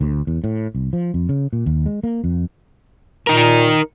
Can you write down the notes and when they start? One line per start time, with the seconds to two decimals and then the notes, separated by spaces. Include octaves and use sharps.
0.01 D2
0.27 E2
0.44 A2
0.75 C2
0.93 F3
1.14 F2
1.29 C#3
1.53 A#2
1.66 D#2
1.86 G#3
2.03 A#3
2.24 F2
3.27 A#2 D#4 A#4